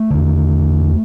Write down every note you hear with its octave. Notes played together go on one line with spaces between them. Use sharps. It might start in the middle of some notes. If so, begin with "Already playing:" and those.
Already playing: A3
E2 D3